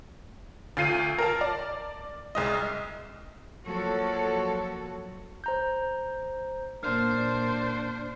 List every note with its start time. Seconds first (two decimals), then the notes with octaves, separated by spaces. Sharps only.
0.77 D2 F4 C7 D#7
1.18 A#4 A5
1.41 D5
2.35 C2 G#3 D#5
3.66 F3 F#3 A#3 F#4 A4 C#5
5.44 C5 A#5 G6
6.83 A#2 A#3 D4 C5 F6